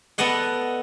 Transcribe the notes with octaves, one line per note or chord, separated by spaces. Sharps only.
B3 A4 D5 D#5 F#5